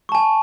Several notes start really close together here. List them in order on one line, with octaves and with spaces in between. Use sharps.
C#6 A5 G#5